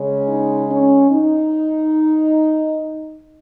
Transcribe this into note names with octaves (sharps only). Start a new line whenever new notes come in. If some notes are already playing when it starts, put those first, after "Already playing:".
Already playing: C#3 G#3 C#4
D#4
C#4
D#4